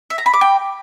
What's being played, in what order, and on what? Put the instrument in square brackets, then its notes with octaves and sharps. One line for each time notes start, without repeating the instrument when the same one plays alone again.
[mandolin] E5
A#5
B5
D6
G5